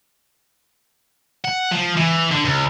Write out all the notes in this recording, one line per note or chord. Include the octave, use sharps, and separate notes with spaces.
F#5
F3
E3
D3
C#2